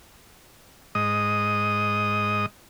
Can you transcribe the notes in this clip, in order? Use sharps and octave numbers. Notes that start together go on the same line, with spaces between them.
G#2 D#5 D#6